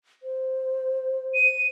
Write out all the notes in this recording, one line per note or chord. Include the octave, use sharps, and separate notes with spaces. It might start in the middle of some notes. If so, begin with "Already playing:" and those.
C5
D#7